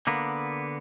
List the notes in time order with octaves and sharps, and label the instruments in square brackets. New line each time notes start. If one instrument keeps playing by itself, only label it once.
[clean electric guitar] D3 A#3 B3